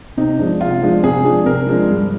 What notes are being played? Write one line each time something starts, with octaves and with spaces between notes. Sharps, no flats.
C3 D#4
F3 G#3 D4
C3 F4
F3 G#3 D4
C3 G#4
F3 G#3 D4
C3 A#4
F3 G#3 D4
G2